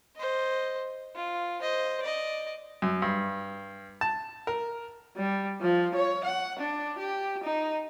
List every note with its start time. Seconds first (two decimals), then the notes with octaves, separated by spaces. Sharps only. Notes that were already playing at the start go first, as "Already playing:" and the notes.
0.16 C5 D#5
1.16 F4
1.62 C5 D#5
2.02 D5 D#5
2.82 F#2
3.02 G2
4.01 A5
4.47 A#4
5.17 G3
5.61 F3
5.95 C#5
6.25 F#5
6.59 D4
6.98 G4
7.44 D#4